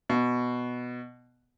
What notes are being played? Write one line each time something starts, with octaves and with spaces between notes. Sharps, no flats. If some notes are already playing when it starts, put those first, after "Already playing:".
B2